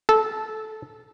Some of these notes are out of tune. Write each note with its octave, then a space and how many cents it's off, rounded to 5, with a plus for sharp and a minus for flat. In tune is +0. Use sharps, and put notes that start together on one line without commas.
A4 -15